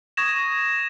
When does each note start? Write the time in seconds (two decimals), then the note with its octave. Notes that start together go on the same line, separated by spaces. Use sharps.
0.17 C#6 D#6 G#6 A#6 E7